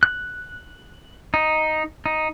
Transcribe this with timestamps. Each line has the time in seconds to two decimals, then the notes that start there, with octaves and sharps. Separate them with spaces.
0.03 F#6
1.34 D#4
2.06 D#4